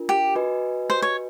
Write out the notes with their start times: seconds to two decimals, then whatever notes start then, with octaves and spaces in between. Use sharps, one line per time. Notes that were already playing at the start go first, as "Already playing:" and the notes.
Already playing: D4 F4 A#4
0.09 G4
0.35 F#4 B4 D#5 G#5
0.90 C5
1.02 C#5